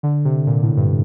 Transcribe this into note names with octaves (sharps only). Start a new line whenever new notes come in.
D3
C3
A#2
A2
G2